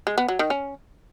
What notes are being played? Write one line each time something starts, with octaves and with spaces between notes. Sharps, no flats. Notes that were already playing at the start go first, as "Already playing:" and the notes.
G#3
B3
F#3
D#3
C#4